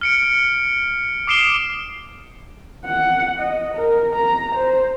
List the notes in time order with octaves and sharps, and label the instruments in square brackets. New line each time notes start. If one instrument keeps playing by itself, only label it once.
[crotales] F6 C#7 D7
D6 D#6 C7 D7 E7 G7
[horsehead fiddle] F#5
D#5
A#4
A#5
C5